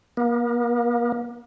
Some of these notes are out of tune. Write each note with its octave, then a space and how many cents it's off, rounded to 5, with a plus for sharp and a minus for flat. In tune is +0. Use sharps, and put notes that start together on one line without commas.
A#3 +40